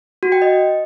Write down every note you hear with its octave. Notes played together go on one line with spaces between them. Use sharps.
F#4
G5
D#5